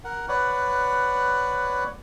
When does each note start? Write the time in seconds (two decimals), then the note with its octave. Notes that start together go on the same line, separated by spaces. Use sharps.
0.04 A#4 F#5
0.28 B4 C#5 D5 F#5